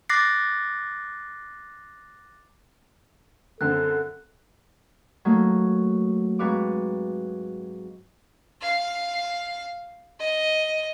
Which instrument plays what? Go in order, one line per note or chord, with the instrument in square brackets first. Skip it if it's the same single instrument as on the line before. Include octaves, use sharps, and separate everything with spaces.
[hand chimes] D6 F#6 A6 A#6 C7
[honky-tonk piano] F#2 D3 C4 [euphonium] A4 [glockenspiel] F#6
[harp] F#3 A3 A#3 D#4
G#2 C4 F#4 B4 F5 D6
[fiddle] F5
D#5